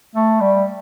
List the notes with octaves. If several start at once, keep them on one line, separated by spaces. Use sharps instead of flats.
A3
G3